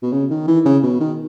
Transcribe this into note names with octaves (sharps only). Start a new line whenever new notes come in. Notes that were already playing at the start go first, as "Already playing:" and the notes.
B2
C#3
D#3
E3
C#3
B2
D#3